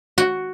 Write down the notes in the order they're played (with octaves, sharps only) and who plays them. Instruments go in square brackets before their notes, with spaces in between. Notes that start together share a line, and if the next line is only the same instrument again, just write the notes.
[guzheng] F#4